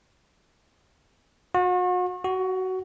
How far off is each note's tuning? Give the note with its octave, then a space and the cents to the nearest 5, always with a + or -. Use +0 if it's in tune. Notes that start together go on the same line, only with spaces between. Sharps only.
F#4 -40
F#4 +15